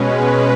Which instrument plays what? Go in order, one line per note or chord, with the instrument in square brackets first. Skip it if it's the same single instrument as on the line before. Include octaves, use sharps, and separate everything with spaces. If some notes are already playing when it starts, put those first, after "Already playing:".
Already playing: [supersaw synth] B2 G#3 C#4 B4